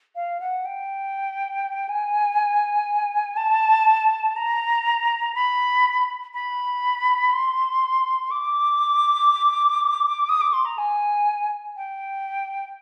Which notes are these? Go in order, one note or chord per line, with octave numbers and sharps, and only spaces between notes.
F5
F#5
G5
G#5
A5
A#5
B5
B5
C6
D6
D#6
D6
C6
A#5
G#5
G5